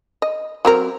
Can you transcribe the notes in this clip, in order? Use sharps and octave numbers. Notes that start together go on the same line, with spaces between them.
D#5
F#3 C4 A#4